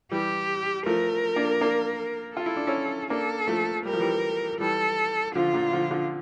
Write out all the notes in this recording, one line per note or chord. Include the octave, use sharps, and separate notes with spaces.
E3 G3 G4
F3 A3 A#4
A#3 D4
A#3 D4
F4 A4
E4
D4
C#4 E4
A#3 D4 A4
F3 A3
G3 A#4
F3
E3 G3
E3 G3 A4
D3 F3 F4
A#2 D3
D3 F3
D3 F3